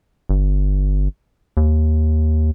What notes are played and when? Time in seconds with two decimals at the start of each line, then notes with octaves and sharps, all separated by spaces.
0.29 G1
1.57 D#2